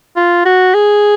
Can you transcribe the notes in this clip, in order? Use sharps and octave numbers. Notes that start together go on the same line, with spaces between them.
F4
F#4
G#4